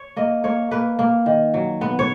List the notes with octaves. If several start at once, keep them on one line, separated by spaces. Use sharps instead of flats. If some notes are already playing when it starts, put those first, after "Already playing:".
Already playing: C#5
A#3 D#5
A#3 C#5
A#3 B4
A#3
D#3
F#3
B3
C#5